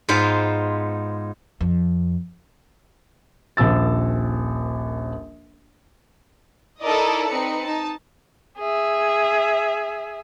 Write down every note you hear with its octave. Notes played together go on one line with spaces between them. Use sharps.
G#2 G#3 B3 F4 C5 F5
F2
D#1 A#1 F3 E6 A6
D#4 E4 A4 A#4 D5 D#5
C4 D#4 B4 C#7
D#4 A5
G#4 E5